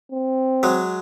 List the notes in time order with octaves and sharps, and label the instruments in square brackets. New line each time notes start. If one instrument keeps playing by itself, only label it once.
[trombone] C4
[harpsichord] F#3 G#3